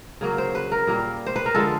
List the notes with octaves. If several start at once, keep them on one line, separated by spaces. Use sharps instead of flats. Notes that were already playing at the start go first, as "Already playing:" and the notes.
C#3 F#3 A#3
C5
B4
A#4
A#2 G3 A#3
C5
B4
A#4
D3 F3 G#3 A4